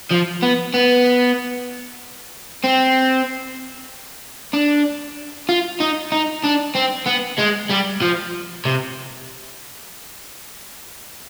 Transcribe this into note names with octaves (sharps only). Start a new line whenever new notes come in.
F3
B3
B3
C4
D4
F4
D#4
D#4
D4
C4
B3
G#3
G3
F3
C3